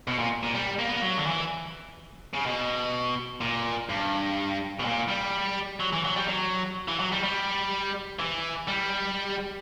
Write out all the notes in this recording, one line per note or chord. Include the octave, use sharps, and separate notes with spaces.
B2
A#2
A#2
G3
A#3
B3
A#3
F#3
D3
E3
C#3
B2
A#2
G2
B2
A#2
G3
F#3
E3
F#3
G3
F#3
E3
F#3
G3
G3
E3
G3